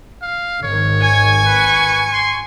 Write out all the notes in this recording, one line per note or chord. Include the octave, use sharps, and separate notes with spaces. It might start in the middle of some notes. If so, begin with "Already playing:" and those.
F5
G#1 G#2 D#3 C#5
G#5 C#6
B4
C6